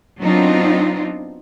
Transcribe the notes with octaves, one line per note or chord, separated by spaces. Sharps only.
F#3 B3 C4 D4 D#4 F4